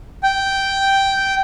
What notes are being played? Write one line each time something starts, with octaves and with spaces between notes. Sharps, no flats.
G5